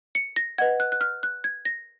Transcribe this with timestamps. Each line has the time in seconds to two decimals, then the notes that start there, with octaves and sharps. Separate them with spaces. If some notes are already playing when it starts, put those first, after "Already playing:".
0.15 C#7
0.36 A#6
0.58 B4 D#5 F#5 G#6
0.80 F#6
0.92 F#6
1.01 F6
1.23 F#6
1.44 G#6
1.65 A#6